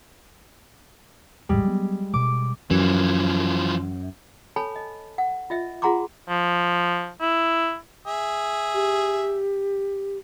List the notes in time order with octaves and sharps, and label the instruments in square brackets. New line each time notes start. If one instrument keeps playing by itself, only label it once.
[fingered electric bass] E1 A1 G#2 [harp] G3 G#3
[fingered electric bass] F#3 B3
[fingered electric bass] B2 G3 [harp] D6
[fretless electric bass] F#2 [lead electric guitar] E3 F3
[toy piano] A4 C#5 G#5 A5 B5
D#5
F#5
F4 D#5 E5
F4 G#4 F#5 A#5 C6 D6
[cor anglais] F3
E4
[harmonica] G#4 E5
[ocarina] G4